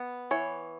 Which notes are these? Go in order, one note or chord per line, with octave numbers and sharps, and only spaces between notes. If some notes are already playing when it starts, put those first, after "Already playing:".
Already playing: B3
E3 C#5